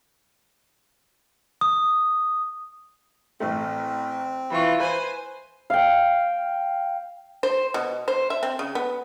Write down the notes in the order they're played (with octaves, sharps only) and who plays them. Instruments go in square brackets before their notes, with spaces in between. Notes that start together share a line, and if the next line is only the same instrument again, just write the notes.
[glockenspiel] D#6
[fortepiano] A1 A3 [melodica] C4
[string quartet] E3 F4 [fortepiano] B5 C#6
[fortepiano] B4 [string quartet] C5 G#5
[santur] F5 G5
[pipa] C5
B2
C5
E5
C4
C#3
B3